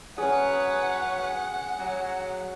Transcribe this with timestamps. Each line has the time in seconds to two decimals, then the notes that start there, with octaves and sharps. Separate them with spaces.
0.18 F#3 C#4 G#4 B4 C#5 F#5
1.80 F#3